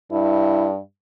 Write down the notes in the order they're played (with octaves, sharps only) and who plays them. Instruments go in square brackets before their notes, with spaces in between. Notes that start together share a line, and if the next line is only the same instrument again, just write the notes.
[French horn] G2 [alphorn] E4